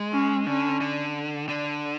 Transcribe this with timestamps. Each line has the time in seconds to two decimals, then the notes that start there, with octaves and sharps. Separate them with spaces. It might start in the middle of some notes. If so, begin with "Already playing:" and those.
Already playing: G#3
0.13 C#4
0.47 D3 C#4
0.81 D3
1.49 D3